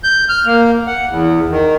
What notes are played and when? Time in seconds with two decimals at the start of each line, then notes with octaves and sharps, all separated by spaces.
0.04 G6
0.29 F6
0.46 A#3
0.87 F#5
1.09 E2
1.50 D#3